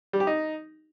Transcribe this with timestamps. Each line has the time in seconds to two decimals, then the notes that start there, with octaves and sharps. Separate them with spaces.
0.13 G3
0.20 G4
0.27 D#4